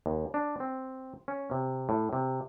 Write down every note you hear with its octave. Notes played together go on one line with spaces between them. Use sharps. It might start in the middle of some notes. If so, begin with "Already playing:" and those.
D#2
D4
C4
C#4
C3
A2
C3